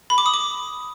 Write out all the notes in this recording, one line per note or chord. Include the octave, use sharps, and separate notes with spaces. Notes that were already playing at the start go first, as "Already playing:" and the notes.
B5
D6
D#6
D6